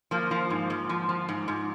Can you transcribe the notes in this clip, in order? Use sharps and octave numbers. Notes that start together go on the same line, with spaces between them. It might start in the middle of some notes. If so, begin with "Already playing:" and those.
F3 A#3
F3
G#2
G#2
F3
F3
G#2
G#2